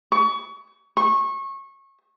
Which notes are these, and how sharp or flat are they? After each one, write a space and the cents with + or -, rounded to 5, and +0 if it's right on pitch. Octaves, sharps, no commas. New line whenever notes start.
C#6 +25
C#6 -25